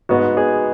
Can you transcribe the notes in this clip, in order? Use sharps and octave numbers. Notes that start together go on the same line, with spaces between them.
G#2 G#3 B3 F#4
G#4